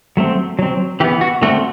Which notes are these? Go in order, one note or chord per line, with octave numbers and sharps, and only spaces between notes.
F#3 A3 C4
F#3 C4
E3 B3 G4
F#4
D3 A3 C4 F#4